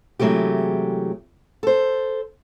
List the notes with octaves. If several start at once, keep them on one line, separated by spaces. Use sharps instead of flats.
C3 E3 F#3 G#3 A3 G4
A4 C5